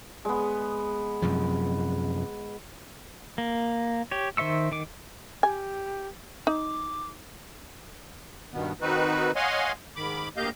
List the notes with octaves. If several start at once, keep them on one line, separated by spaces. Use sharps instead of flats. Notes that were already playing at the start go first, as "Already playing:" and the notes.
G#3 B3
F#2 C3 F3
A#3
G4 C#5
D#3 C5 E5 C#6 E6
D#3 D6
G4 G#5
D#4 D6
G2 B2 D#3 B3
D#3 C4 D#4 F#4 B4
C#5 D#5 F5 F#5 G#5 C6
G#2 D#3 B5 D6
D2 A#3 G4 D#5 F5 G6